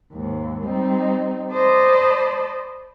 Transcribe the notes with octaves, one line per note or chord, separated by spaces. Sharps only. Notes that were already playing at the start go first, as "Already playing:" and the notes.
D#2 G#2
G3 C4 D#4
C5 D5 D#5 A5 B5